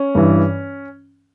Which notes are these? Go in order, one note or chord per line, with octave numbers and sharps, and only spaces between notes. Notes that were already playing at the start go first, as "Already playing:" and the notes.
Already playing: C#4
G2 E3